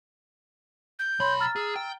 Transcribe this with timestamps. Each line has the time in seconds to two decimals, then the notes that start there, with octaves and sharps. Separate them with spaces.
0.98 G6
1.20 B1 C#5 B5 C6
1.40 A#5 E6 F6 A6
1.56 G#4 E6
1.76 G5